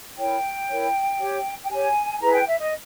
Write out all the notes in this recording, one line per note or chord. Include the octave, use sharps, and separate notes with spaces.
E4 A#4 C#5 G5
E4 A#4 C#5
G4 C#5
G5
G4 C#5 G#5
E4 G#4 B4 A#5
G5
E5
D#5